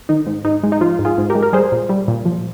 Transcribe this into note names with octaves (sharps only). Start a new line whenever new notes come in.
D#3 D#4
G#2
G#2 D#4
G#3
D#4
F3 F4
G#2
F4 G#4
G#2
G4 A#4
G#3
A#4
G3 G#4 C5
A#2
G3
A#2
F3